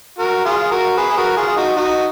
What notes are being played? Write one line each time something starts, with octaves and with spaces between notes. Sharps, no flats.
F#4 A#4
F4 G#4
F#4 A#4
G#4 B4
G#4
F#4 A#4
F4 G#4
F4
D#4 F#4
D#4 F#4